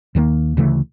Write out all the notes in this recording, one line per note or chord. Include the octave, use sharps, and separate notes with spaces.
D#2 D#3 F3 A#3
D2 C#3 E3 A3